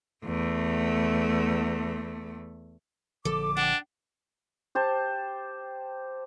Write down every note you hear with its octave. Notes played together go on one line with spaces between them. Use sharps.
E2 A3
A#1 D3 F3 A4 D6
D4 F#5 G5
G4 C5 A5